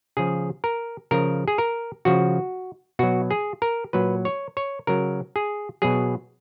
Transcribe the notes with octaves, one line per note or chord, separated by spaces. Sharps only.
C#3 F3 G#4
A#4
C#3 F3 A#4
G#4
A#4
C#3 F3 F#4
B2 F#3 F#4
G#4
A#4
A#2 F#3 B4
C#5
C#5
C#3 F#3 A#4
G#4
B2 F#3 G#4